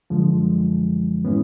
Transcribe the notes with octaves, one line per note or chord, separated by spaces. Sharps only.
F#2 D3 F3 G#3
A2 E3 G#3 B3 C#4